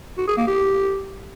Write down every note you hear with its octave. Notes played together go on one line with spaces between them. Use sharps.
F#4
G#4
A#3
G4